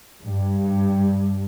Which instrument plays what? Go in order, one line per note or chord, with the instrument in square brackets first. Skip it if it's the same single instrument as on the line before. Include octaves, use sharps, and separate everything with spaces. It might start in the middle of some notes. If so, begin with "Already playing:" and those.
[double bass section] G2